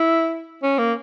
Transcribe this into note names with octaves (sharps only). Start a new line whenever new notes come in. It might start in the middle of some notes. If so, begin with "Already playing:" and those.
Already playing: E4
C#4
A#3